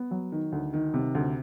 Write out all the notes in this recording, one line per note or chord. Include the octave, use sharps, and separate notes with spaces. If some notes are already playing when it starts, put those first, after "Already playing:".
Already playing: B3
F#3
D#3
D2
D#3
C3
D2